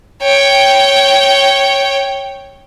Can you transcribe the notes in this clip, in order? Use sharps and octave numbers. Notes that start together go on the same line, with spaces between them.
C#5 G5